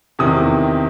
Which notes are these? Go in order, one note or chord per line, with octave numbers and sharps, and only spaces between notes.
E2 C3 D#3 D#6